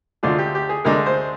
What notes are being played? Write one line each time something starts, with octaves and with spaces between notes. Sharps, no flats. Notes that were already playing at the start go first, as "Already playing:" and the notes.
D2 D3 G#3 D4 F4
G4
G4
G#4
D2 D3 G#3 D4 A#4
C5